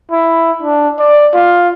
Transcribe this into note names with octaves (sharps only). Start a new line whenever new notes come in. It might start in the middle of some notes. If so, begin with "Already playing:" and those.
E4
D4
D5
F4